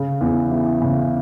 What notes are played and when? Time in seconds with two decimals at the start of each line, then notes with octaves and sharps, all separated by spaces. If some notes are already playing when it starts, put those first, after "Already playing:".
Already playing: C#3
0.21 E2
0.51 E3
0.82 C#3